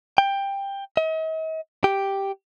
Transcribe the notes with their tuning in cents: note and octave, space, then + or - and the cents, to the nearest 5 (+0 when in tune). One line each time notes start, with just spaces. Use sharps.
G5 +15
D#5 +45
G4 +0